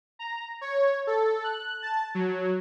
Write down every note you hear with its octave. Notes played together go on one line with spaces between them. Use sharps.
A#5
C#5
A4
F#6
A5
F#3